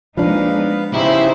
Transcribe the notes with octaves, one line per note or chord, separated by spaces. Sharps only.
F3 G#3 A#3 D4 D#4 B4 F5
B3
C#3 D#4 E4 G4 C5 E5